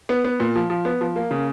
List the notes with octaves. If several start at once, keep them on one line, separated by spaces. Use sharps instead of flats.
B3
B3
A#2
F3
F3
B3
F3
A#3
C#3